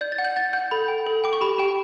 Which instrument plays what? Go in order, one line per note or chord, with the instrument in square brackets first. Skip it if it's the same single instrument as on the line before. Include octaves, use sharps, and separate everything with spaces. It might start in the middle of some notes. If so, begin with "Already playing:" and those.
[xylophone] D5 G6
A6
F#5
G6
F#5 A6
F#5 G6
A4 B5
G5
A4
G5 D6
C#6
G4 B5
G4 G5